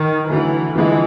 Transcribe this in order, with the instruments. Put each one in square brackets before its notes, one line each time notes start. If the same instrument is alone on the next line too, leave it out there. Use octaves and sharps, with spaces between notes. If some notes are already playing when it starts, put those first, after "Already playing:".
Already playing: [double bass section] D#3
[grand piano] D3 F#3 A3 [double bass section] E3
[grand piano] D3 F3 G#3 [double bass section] E3